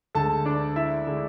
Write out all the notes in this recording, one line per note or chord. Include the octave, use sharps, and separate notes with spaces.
D2 D3 G#3 A4 A5
D4 D5
E4 E5
D3 G#3